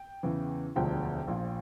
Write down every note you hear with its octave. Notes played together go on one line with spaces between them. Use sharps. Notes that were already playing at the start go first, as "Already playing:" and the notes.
Already playing: G5
E2 C#3 E3
E1 D2 D3 F3 G5
A#1 A#2 F3